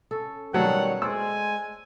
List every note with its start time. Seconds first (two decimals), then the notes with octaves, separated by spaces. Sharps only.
0.11 C#4 A4
0.54 B2 D#3 F#3 G3 A3 A4 C#5 F#5
1.02 G#3 C5 D5 G#5 E6